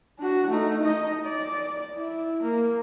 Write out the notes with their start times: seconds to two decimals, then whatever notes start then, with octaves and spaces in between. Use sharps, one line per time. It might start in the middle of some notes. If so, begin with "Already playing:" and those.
0.19 D4 F#4
0.50 A3 D#4
0.82 D#4 D#5
1.25 D5
1.96 E4
2.42 A#3